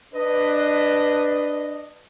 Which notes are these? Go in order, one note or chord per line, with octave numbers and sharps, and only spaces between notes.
D4 B4 D#5